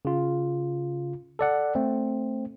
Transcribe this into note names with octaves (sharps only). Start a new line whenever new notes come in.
C#3 F4
A4 D5 F#5
A3 C4